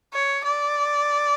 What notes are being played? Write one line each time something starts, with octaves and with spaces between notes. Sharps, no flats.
C#5
D5